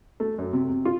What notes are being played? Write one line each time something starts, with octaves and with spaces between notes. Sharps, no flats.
A3
F#2
C3
C3
F4